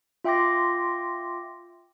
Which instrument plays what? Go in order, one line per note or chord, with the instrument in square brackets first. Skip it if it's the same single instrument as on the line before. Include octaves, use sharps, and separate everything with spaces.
[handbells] F4 E5 G5 C6 D6 A#6